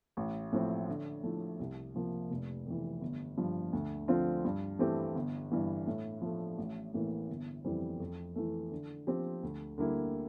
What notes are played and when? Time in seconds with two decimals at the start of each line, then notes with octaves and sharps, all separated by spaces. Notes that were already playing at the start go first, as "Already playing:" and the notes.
0.17 A1
0.52 A2 F3 C4
0.88 D3
1.23 F3 A3 E4
1.59 C2
1.95 C3 F3 A#3
2.30 F1
2.66 F2 E3
3.01 G1
3.37 G2 F3
3.73 D2
4.08 D3 F3 C4 F4
4.44 G2
4.79 E3 A3 C4 G4
5.15 G1
5.52 G2 E3
5.87 A2
6.22 F3 A3
6.58 A1
6.94 A2 E3 A#3
7.30 G1
7.64 F2 E3 G3 C4
8.00 F2
8.36 E3 A3
8.71 D3
9.07 F3 C4 G4
9.43 D2
9.78 D3 G3 A#3 E4